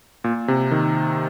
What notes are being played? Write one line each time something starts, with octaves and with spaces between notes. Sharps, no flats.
A#2
C3
D#3